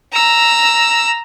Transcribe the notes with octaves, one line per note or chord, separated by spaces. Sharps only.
A#5 E6